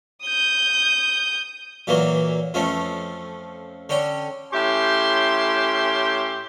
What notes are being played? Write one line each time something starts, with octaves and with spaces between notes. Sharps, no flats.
D#6 G6
A#2 E3 F#3 A#3
F2 F3 A3 C#4
D3 C#4 G5
A2 C#4 G4 E5 G5 C6